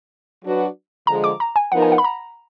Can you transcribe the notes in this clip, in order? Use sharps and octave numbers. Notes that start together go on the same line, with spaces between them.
F#3 D4 F#4 B4
D3 F3 G#3 A#5
D6
A#5
G#5
F3 B3 D#4 A#4 F#5
G#5
F#5
B5
A#5